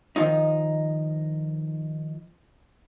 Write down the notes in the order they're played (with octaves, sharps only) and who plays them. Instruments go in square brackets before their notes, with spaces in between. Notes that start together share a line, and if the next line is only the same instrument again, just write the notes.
[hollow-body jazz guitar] D#3 F3 D#4